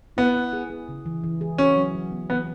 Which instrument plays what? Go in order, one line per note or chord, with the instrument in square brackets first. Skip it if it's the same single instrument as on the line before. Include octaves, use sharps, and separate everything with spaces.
[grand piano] B3 [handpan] E4
[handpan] E4
G#4
G#4
C#3
E3
E3
G#4
[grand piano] C#4 [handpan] F#4
[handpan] F#3
F#3
B3
[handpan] E3 [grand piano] B3